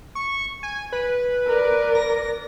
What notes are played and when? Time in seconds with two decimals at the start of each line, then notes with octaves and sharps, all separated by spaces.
0.15 C#6
0.63 G#5
0.93 B4
1.46 A#4 D5
1.95 A#6